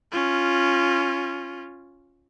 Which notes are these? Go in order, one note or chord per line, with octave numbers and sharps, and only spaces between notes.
C#4 F4